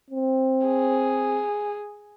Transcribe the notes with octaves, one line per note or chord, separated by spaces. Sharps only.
C4
G#4